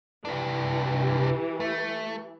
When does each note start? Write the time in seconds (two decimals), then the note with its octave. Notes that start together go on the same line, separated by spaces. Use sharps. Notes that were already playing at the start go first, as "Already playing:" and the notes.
0.25 C2 E3 D4 G4
1.60 A3